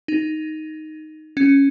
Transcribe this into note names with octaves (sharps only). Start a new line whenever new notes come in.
D#4
C#4